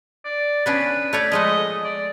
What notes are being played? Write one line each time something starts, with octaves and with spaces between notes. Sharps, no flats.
D5
B3 C#4 D4 B4
A3 C#5 D5
F3 G#3 A3 D#5
D5